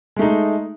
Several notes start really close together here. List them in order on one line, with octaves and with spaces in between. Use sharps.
G#3 A3 D#4